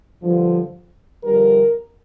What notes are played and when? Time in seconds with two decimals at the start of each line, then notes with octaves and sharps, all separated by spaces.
0.23 G2 D3 F3
1.23 F2 D3 G3 A#4